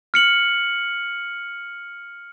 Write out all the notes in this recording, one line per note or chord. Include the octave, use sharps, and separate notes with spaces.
F6 C#7 F#7